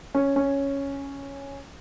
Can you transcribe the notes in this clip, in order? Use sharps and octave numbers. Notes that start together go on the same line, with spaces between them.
C#4
C#4